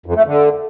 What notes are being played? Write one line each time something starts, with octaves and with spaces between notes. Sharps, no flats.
F2
A3
D3